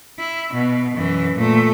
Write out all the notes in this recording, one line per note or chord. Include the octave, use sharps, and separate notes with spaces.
E4
B2
F#2 E3
A#2 A3